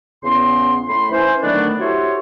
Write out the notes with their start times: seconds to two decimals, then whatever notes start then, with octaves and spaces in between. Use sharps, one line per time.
0.24 E2 C#3 B3 C#4 C6
0.88 A2 B5 C6
1.11 E3 C#4 C5
1.42 D3 D#3 F#3 A3 B3 D4
1.80 E4 F#4 G4 A4 C5 C#5